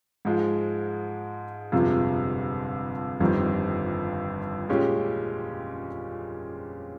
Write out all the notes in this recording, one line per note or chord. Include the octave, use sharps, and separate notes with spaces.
G#2 F3 G#3
G1 F2 C3 F3 G#3
G1 F2 D#3 G3 C4
A#2 G#3 C#4 G4